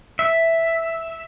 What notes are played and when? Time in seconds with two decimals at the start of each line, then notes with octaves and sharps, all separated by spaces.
0.19 E5